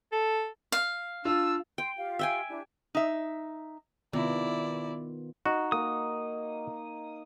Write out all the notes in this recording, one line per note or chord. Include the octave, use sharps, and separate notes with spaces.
A4
F5
D4 F4 E6
G5 C6
F4 G4 F5
E5 G5 G#5
D4 E4 G4
D#4 E5
C3 D#3 B3 E4 F4 D5
D#4 F#4
A#3 D#6